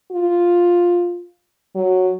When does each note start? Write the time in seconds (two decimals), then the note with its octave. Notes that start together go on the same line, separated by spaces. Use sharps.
0.12 F4
1.75 F#3